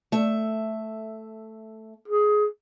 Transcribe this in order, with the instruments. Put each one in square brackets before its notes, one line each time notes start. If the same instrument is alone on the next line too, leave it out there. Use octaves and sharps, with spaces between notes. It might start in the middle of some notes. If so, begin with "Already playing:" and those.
[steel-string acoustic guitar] A3 E5
[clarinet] G#4